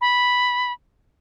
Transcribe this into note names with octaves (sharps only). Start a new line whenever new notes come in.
B5